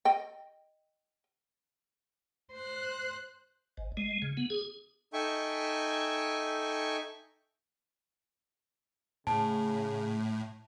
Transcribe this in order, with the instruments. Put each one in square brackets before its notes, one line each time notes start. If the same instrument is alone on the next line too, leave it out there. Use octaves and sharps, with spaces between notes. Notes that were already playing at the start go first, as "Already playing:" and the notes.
[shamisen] D#5 G5
[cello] C5 [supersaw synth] F#6
[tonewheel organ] G#1
G#3
C#3
B3
G#4
[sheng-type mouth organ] D#4 A4 E5 G5 G#5 C#6
[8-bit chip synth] A2 [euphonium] C#3 [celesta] A5